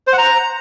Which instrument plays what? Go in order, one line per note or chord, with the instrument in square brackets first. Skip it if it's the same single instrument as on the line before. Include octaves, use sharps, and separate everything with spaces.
[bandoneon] C5
F#5
A#5